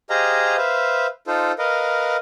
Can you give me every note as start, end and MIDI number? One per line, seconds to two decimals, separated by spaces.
0.10 0.57 67
0.10 0.57 68
0.10 0.57 72
0.10 0.57 75
0.10 0.57 77
0.10 0.57 82
0.57 1.07 71
0.57 1.07 72
0.57 1.07 76
0.57 1.07 77
1.27 1.52 63
1.27 1.52 65
1.27 1.52 69
1.27 1.52 72
1.58 2.17 70
1.58 2.17 71
1.58 2.17 75
1.58 2.17 77